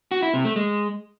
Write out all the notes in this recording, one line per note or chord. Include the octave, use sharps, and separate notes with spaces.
F#4
E4
C3
A3
G#3